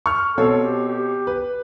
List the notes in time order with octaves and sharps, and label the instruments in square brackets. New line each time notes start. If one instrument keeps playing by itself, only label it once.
[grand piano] C#6 F6
[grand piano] B2 C4 C#5 [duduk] A4
[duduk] G4
G4
[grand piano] B4